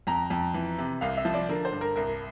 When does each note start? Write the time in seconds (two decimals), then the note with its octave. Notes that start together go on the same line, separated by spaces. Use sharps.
0.07 F2 A#5
0.30 F2
0.54 E3
0.78 C3
1.01 C2 F5
1.17 E5
1.25 F3
1.34 D5
1.49 D3 A#4
1.65 C5
1.72 G2
1.81 A#4
1.96 C2 A#4